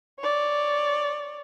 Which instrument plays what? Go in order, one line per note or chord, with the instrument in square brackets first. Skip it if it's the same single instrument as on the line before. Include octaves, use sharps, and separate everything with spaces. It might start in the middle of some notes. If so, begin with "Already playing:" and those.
[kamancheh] C#5 D5